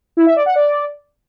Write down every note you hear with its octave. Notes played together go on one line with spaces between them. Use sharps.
E4
E5
D5
F#5
D5